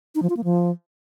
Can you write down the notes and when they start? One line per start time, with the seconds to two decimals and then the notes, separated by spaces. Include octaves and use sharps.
0.15 D#4
0.22 F3
0.30 F4
0.37 A#3
0.44 F3